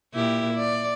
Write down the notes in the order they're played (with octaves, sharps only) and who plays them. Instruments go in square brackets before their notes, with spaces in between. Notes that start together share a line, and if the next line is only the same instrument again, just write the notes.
[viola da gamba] A#2 E4 G4
D5